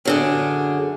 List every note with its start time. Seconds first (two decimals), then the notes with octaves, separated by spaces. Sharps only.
0.05 F#2 D3 G#4